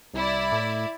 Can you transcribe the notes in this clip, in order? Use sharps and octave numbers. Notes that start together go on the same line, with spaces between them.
C2 E4 D5
A2